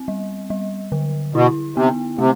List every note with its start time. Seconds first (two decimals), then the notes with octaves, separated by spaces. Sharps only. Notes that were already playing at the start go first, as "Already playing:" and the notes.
Already playing: C4
0.08 G3
0.50 G3
0.92 D3
1.34 B2 E4
1.76 C3 B3
2.18 C3 A3